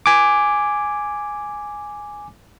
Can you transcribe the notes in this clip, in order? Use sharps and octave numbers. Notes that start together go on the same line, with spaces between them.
G#5 D6